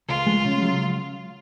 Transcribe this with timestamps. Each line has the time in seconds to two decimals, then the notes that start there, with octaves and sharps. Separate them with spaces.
0.09 C#2 F4
0.26 G#3
0.45 C#3
0.61 F#3